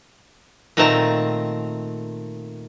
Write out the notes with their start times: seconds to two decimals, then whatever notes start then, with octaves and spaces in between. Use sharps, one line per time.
0.77 A#2 D#3 A3 C4 A5 A#5